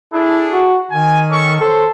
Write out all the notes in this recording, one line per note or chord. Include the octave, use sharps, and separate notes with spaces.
D4 E4 G#4 A4
F#4
D#3 G#5
C#4 A4 C#6
A4 C5 C#5 C6